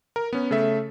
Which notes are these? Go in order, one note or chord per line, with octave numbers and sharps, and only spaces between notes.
A#4
B3 C#4
C#3 A3 A4 E5